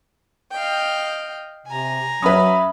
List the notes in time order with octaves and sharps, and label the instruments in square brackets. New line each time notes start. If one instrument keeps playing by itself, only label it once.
[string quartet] D#5 F5 G5
[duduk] C3 [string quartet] G#5 A#5
[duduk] F#3 [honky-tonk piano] C#4 B4 [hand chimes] E5 B5 D#6